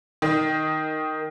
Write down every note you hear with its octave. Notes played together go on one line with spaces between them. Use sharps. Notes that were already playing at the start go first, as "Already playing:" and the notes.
D#3